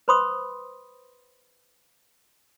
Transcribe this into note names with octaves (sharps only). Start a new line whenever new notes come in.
B4 C5 B5 C6 D#6